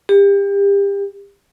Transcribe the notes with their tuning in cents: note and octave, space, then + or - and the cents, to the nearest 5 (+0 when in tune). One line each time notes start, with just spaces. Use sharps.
G4 +30